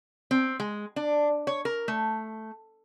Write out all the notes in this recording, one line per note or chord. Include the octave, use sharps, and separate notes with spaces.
C4
G#3
D4
C#5
A#4
A3